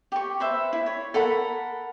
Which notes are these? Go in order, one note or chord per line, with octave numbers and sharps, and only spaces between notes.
G4 C#6
B4 C5 E5
E4
C#5
A4 A#4 F#5 B5